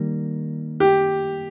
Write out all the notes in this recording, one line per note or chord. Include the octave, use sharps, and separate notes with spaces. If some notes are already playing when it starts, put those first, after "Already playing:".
Already playing: D#3 G3 A#3
G4